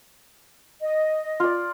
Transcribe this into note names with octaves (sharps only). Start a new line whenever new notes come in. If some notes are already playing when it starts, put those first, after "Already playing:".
D#5
F4 D5